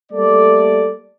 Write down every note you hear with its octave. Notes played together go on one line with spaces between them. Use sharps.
G3 A3 A#3 A4 D5